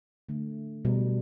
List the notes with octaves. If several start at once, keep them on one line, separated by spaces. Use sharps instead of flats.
D3 A3
B2 G3